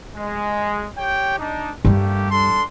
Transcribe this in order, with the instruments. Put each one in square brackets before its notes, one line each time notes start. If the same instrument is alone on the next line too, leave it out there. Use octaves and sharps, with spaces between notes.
[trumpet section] G#3
G4 C#5 G5
D4 D#4
[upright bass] G2 G3 [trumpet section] A3 A#3 G4
[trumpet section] D4 A4 C6